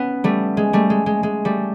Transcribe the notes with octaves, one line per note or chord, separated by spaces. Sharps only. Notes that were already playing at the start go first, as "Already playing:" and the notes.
Already playing: B3 C#4
G3 A3
G#3
G3 A3
G#3
G#3
G#3
G3 A3